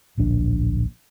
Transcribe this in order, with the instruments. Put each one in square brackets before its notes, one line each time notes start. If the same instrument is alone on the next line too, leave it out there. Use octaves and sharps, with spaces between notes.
[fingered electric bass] D1 A#1 D4